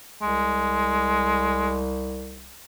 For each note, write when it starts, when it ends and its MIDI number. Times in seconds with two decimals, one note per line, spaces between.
0.22 2.63 36
0.22 1.80 56